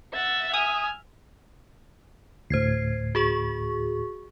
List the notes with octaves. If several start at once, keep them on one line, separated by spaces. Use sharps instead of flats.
E5 F#5 A6
G#5 D#6 F6
D2 A2 C5 G#6 C7
F#4 G#4 C#6